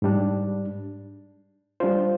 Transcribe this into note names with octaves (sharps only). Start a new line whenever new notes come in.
G#2 G3 D4
G3 D4 F4 C5